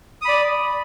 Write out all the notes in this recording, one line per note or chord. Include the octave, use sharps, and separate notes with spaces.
D5 B5 D#6